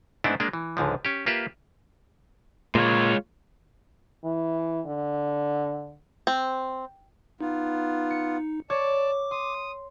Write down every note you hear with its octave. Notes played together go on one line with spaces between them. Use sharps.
G#2 A3 B3 C4 D4 E4
G#3 A#3 D4
E3
C#2 G#2 D3 F3
C#4 G4
A#3 F4 G4 B4 E5
A#2 G#3 F4 C#5
E3
D3
C4
B3 D#4 F4
C#7
C#5 D5 A5 D6
C6 D#6